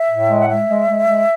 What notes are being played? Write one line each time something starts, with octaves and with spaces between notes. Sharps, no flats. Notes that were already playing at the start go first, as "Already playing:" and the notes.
Already playing: E5
A2
G#3
F#5
G#3 E5
G#3
G#3
G#3